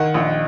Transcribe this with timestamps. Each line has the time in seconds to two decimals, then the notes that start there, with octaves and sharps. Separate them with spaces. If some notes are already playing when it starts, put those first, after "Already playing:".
Already playing: D#3 F#5
0.14 A#1